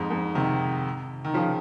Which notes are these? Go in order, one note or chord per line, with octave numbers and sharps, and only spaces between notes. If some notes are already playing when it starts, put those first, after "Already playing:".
Already playing: F2 G#2
F2
C3 D#3
D#3
C#3 F3